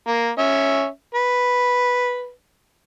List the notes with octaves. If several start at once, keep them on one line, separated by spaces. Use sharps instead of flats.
A#3
C#4 E5
B4